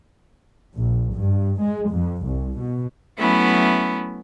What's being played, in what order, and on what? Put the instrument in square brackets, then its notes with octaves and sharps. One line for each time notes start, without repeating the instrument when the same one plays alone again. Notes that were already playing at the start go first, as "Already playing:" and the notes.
[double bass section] A#1
G2
G#3
F2
C2
B2
[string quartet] F#3 A3 B3 C#4 E4